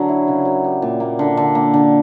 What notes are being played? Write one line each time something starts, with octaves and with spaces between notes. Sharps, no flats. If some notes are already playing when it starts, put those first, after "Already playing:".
Already playing: D3 F#3 A#4
E4
C#3
F#3
G4
A#2
A#3
D3
D3
A#3
D3